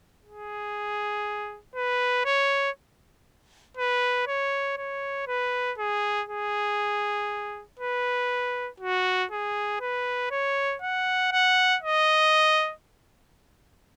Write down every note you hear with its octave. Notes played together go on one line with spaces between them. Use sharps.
G#4
B4
C#5
B4
C#5
C#5
B4
G#4
G#4
B4
F#4
G#4
B4
C#5
F#5
F#5
D#5